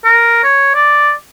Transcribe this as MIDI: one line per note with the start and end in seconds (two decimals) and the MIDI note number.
0.05 0.43 70
0.44 0.73 73
0.75 1.12 74